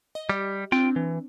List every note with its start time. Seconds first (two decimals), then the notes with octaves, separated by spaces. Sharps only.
0.15 D#5
0.29 G3 G4
0.72 C4 D4 F4 G5
0.96 E3